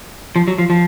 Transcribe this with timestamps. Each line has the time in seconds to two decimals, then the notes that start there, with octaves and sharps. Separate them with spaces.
0.36 F3
0.48 F#3
0.58 F3
0.70 F3